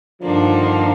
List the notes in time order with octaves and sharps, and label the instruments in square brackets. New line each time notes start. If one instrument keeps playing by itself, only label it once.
[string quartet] G2 D#3 A#3 D4 [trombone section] D3 F3